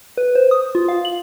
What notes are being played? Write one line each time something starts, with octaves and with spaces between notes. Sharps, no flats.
B4
C5
D#6
F4
F5
F#7